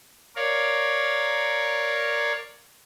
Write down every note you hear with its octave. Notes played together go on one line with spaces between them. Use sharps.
A#4 C#5 D5 F5